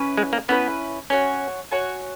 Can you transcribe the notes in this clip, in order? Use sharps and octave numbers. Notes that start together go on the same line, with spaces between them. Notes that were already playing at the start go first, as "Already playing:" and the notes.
Already playing: C#4 E4 B4
G#3
A#3
B3 C#4 E4 B4
C#4 F#4 C#5 G#5
F#4 C#5 G#5